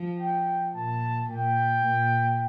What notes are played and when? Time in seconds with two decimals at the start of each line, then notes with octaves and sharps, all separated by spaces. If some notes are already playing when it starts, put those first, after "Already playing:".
Already playing: F3
0.20 G5
0.75 A#2 A5
1.29 A#2 G5
1.85 A#2